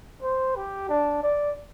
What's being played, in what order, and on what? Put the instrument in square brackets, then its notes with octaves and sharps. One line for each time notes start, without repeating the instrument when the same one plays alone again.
[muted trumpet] C5
G4
D4
D5